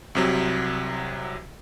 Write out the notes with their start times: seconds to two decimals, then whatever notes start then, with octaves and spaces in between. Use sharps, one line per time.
0.15 C2 C3 F#3